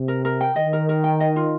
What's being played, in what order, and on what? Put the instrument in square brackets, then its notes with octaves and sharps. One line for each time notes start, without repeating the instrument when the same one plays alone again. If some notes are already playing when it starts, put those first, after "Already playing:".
Already playing: [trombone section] C3
[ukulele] A#4
A#4
G5
[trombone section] D#3 [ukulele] D#5
[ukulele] A#4
A#4
G5
D#5
F4